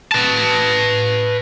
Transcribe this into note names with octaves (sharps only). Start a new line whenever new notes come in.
B4 A5